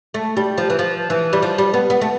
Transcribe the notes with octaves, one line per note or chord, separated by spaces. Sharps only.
A3
G3
F3
E3
F3
E3
G3
F3
G3
B3
B3
A3